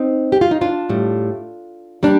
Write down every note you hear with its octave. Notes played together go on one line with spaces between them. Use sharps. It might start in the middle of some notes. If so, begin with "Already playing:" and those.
Already playing: C4 D#4
G4
F4
D#4
D4 F4
A2 G3
G3 A#3 D4